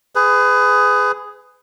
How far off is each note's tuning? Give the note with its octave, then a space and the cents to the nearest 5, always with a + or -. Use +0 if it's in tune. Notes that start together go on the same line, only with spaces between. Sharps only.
G#4 +0 B4 +25